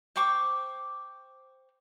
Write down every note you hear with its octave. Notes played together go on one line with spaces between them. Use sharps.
C5 G5 C#6 D6